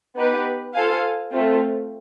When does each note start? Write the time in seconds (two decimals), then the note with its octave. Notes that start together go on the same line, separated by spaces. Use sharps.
0.16 B3 D#4 G4 B4
0.74 F4 A4 C5 F5 G#5
1.32 A3 C4 F4